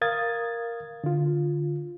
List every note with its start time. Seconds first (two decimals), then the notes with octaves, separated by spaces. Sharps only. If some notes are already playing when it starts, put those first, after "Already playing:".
0.01 A#4 F5 D#6 G#6 A6
1.04 D3 F4